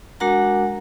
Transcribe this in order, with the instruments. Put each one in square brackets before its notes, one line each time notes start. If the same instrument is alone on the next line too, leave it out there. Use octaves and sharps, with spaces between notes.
[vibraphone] G#3 D4 F#4 A#4 F#5 A#5